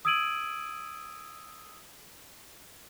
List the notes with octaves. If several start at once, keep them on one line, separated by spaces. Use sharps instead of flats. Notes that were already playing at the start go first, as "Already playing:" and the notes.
D#6 E6 G#6 D7 D#7 F#7